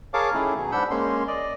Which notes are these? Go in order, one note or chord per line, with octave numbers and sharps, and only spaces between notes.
G#4 A#4 C#5 F5 A5 D6
D#3 A3 C#4 E4 G#4
B2 F#3 G#4
G#2 D4 F#5 B5 E6 G6
G#3 A#3 C#4 C6
D5 D#5